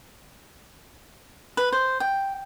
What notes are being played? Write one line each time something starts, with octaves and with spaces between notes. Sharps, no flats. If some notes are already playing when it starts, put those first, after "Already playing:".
B4
C5
G5